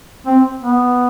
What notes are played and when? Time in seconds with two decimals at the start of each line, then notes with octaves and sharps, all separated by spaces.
0.27 C4
0.63 B3